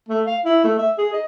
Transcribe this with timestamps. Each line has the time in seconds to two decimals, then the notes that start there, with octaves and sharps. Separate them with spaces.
0.09 A3
0.27 F5
0.45 E4
0.64 A3
0.78 E5
0.98 G#4
1.13 D#5